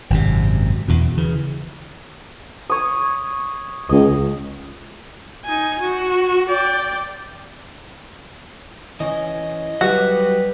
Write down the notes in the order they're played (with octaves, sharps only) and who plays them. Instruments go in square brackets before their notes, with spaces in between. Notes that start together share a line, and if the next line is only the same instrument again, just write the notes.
[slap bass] G#1 F#2 C3
E2 B2
C#3 E3
[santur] C#5 D#6
[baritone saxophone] C#2 [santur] D#5
[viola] D#4 G#5
F#4
D5 G5
[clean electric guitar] E3 C#4 [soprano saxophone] D#5
[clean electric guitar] F#3 G3 [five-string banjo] F#4 [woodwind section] G4 B4